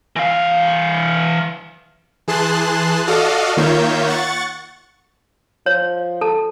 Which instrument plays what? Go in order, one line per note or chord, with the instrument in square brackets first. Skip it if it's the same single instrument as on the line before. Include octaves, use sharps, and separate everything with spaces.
[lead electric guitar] E3 F5
[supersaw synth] E3 G#4 A5 C6 F#6
F#4 A4 D5 D#5 F5
D#3 A#3 F4 C#5 E5 G6
F#5 C#6 A6
[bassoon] F3 [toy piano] C#5
[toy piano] A4 A5